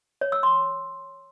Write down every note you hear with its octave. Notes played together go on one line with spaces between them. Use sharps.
C#5
E6
C6